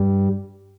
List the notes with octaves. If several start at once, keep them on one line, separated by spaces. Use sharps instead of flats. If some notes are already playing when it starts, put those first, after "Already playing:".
Already playing: G2 G3